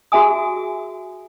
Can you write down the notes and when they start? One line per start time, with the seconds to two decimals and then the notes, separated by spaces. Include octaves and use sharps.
0.12 F#4 G#4 E5 G#5 D#6